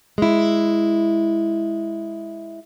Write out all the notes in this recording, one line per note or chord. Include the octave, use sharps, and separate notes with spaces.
G#3 E4